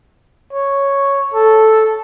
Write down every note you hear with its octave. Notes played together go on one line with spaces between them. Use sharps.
C#5
A4